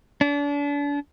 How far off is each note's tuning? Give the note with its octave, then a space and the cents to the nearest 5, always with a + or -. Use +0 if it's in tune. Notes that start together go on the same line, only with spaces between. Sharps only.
D4 -35